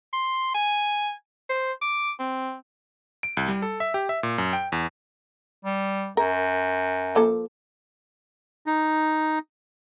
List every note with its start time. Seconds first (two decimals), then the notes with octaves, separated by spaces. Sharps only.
0.13 C6
0.55 G#5
1.50 C5
1.82 D6
2.19 C4
3.23 D7
3.37 C2
3.48 G3
3.62 A4
3.80 E5
3.94 G4
4.09 E5
4.23 A#2
4.38 F#2
4.53 G5
4.72 E2
5.65 G3
6.17 F#2 A#4
7.15 F3 A#3 A4
8.66 D#4